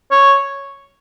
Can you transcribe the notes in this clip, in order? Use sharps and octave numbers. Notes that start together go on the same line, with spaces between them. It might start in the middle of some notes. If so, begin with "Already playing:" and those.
C#5